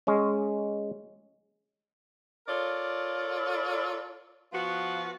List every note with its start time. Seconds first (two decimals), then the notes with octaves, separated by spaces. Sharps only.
0.07 G#3 C#4
2.48 F4 A4 A#4 C#5 D5
4.53 F3 B3 F4 F#4